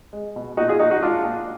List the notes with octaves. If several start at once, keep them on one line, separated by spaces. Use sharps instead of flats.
G#3
B2
A#2 D#4 F#4
F4 G#4
A#2 D#4 F#4
D#4 F#4
G#3 D4 F4
A#2